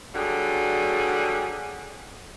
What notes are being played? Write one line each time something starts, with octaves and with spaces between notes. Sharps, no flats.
D3 F#3 G3 F#4 G#4